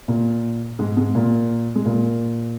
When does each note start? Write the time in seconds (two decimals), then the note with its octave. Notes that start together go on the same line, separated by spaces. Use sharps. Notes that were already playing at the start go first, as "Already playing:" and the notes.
0.08 A#2 A#3
0.79 G#2 G#3
0.97 G#2 G#3
1.15 A#2 A#3
1.75 G#3
1.85 A#2 A#3